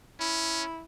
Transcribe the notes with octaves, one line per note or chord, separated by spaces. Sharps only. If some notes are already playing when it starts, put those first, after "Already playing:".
C#4 E4